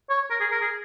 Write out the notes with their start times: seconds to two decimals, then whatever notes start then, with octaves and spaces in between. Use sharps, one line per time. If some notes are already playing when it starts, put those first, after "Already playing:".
0.10 C#5
0.30 A#4
0.40 G#4
0.52 A#4
0.61 G#4